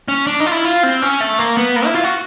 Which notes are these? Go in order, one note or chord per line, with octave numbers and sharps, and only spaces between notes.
C#4
D4
D#4
F4
E4
F4
C4
C#4
A3
A#3
B3
A#3
E4
F4
F#4